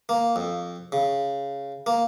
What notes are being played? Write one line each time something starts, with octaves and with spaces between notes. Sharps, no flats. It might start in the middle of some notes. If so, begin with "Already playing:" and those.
A#3
F2
C#3
A#3